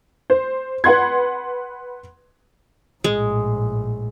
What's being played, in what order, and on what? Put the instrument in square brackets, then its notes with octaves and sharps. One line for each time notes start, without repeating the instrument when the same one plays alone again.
[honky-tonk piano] C5
B4 F#5 C6 G#6
[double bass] A#1 A2 [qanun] G#3